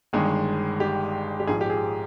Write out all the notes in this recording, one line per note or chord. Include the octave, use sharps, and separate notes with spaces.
G1 G2 D#3 G#3 G#4
G4
G4
A#1 G#2 F3 G#4
G4
G#4